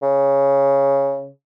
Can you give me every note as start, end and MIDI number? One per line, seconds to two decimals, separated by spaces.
0.02 1.29 49